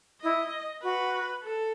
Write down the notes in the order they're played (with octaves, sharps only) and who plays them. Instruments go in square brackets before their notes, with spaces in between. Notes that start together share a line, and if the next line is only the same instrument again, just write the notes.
[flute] E4 [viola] D#5
[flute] F#4 [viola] B4
[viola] A4